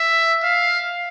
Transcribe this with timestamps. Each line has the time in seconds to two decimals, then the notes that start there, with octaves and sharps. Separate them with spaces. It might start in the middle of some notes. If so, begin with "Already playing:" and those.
Already playing: E5
0.43 F5